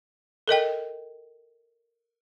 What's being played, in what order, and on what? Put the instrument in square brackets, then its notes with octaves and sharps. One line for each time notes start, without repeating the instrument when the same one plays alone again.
[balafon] A4 A#4 D#5 G5